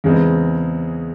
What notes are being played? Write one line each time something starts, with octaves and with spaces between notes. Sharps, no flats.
E2 C#3 E3 G#3 C4